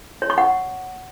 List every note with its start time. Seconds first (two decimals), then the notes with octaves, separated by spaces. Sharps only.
0.22 C#5
0.30 C#6
0.38 F#5